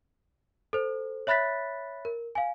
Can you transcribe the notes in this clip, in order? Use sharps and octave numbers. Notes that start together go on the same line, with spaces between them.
A4 C5
C#5 E5 B5 F#6 A6 B6
A#4
F5 G#5